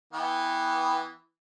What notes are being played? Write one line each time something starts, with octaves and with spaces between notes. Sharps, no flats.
E3 B3 G5